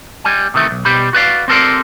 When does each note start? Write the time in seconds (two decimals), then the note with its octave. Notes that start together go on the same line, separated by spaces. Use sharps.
0.24 G3 G#5
0.54 C3 D#3 E3 A3
0.71 B1
0.85 B2 G3 G4 C5 B5
1.13 F#4 B4 D5 F5
1.48 C4 G4 A4 A#4 C5 D5